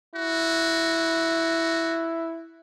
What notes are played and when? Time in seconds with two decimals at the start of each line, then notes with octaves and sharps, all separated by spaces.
0.15 E4 F#4